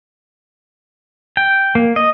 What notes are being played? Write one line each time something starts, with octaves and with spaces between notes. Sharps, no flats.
G5
A#3
D#5